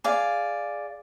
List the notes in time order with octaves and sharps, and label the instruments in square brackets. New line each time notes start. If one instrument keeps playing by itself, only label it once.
[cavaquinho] G#4 D5 F5